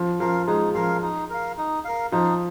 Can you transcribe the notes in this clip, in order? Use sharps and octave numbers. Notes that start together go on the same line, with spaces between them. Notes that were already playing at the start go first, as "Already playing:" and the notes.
Already playing: F3
F3 A#4 F5
G#3 D#4
F3 A#4 F5
D#4
A#4 F5
D#4
A#4 F5
F3 D#4